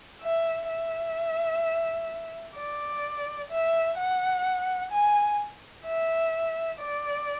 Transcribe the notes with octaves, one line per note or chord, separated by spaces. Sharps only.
E5
E5
D5
E5
F#5
G#5
E5
D5